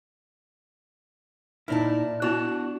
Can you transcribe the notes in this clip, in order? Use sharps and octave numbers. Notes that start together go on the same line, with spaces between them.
A#2 D#4 E4 A#4 D5 A5
B3 D4 E4 F#4